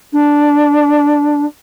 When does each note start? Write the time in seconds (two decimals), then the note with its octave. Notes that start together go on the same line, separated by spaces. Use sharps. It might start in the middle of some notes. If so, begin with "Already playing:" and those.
0.13 D4